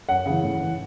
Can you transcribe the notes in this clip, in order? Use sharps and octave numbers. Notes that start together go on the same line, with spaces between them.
F#2 F#5
C#3 E3
A2
E3